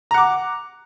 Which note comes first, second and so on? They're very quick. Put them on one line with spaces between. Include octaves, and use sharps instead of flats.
A#5 F#5 D6